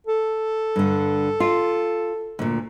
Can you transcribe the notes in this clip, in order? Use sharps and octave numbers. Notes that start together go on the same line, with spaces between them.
A4
G2 D3
F4
D2 A#2